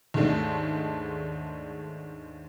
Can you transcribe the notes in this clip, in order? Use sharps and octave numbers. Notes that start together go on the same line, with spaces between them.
D#2 G#2 D#3 G#3 A3 D4